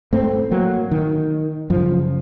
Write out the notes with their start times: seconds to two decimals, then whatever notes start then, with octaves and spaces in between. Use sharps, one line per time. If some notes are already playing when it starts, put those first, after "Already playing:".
0.13 A2 A3 C4
0.51 F#3 A#3
0.91 D#3
1.70 F#2 C#3 F3